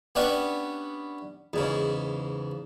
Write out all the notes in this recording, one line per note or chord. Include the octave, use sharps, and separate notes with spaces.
B3 C#4 D4 G4 B4 E5
E2 G#2 C#3